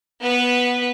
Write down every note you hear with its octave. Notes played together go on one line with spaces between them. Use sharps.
B3 B4